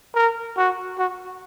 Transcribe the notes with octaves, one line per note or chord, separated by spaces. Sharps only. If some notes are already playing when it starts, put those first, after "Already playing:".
A#4
F#4
F#4